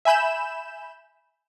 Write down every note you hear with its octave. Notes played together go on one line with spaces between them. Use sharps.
E5 G#5 B5 G6 E7